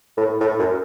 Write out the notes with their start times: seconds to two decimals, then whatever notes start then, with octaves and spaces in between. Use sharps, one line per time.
0.17 A2
0.40 A2
0.59 F#2